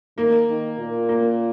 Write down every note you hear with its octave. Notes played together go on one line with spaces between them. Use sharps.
D#3 A#3
D#3
A#2
A#3